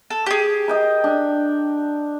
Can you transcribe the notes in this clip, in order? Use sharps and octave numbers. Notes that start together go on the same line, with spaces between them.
A4
G4 G#4
D#5 G5 A#5
D4